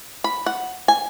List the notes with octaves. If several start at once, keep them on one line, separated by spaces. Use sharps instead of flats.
B5
F#5
G#5